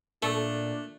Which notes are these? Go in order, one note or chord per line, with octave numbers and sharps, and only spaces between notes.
A#2 A3 D4 A4